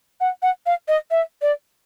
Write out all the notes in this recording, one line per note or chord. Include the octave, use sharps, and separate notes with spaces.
F#5
F#5
F5
D#5
E5
D5